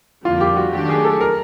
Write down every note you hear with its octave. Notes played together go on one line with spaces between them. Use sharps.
F2 D3 G3 A#3 F4
G4
F#4
D#3 F#3 A3 D4 G4
G#4
A4
A#4